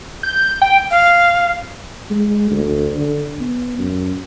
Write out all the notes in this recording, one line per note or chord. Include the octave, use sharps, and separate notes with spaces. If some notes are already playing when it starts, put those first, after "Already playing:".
G6
G5
F5
G#3
D2
D3
B3
F#2